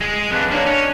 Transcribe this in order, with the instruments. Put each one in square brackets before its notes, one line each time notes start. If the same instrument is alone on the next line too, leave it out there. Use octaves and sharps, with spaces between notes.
[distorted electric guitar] G#3 G#4
[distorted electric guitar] F2 D4 [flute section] B4 F#6
[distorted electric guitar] A#3 D#4 [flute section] D4 C#5 D#5
[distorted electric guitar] C#4